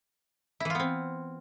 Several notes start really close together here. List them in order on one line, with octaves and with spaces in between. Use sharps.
E4 E3 F4 B3 C4